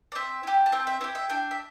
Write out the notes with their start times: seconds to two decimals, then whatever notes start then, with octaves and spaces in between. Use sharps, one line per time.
0.12 D5
0.15 C4 E5
0.43 E4 G4
0.66 A5
0.72 C4 G5
0.87 E5
1.01 E4 C5
1.04 G4
1.15 E5
1.30 D4 G5
1.51 E5